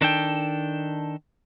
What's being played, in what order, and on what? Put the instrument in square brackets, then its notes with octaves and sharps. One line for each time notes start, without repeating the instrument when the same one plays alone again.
[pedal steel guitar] D#3 D4 A4 G5